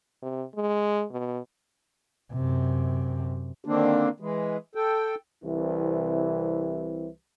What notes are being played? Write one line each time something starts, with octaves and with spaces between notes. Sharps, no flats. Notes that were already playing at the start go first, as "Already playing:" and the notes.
C3
G#3
B2
F#2 C3
D3 D#3 A#3 C4 D4
E3 G#3
A4 G5
C2 C3 E3